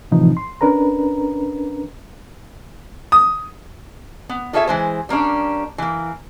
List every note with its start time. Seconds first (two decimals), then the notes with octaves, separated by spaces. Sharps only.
0.11 A2 C3 E3 F3 D#4
0.37 C6
0.61 C#4 D4 A#4 B4 A#5
3.12 D#6
4.29 B3
4.53 F4 G#4 A4 C#5 D#5 E5
4.67 E3 G#3 C5
5.09 G3 A#3 C#4 D4
5.78 E3 A#3